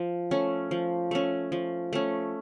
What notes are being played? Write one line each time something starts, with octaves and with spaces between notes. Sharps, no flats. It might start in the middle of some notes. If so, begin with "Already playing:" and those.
Already playing: F3
A3 C#4
F3
A3 C#4
F3
A3 C#4